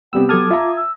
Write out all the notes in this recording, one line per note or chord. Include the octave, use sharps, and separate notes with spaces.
C3 G3 B3 G4 G5 E6
F#3 A4 A5 D6 D#6 F6 G#6
F4 E5 A#5
E6